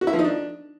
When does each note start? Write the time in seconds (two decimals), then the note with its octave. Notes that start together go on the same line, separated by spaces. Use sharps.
0.01 F#4
0.07 E4
0.13 F3
0.19 D#4
0.24 D4